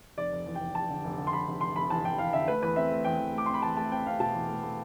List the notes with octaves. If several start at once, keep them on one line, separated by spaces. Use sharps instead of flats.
F1 D5
F1
E2
F1 G5
F1 A5
D3
F1
D3
C6
F1 B5
F1
F1 C6
F1 B5
E2 A5
E2 G5
E2 F5
D3 E5
A3 B4
E2 B4
C4 E5
A3
E2 G5
E2
A3 D6
C4 C6
B5
E2 A5
A3 A5
C4 G5
C4 F5
B2 A5
E2
A3
A3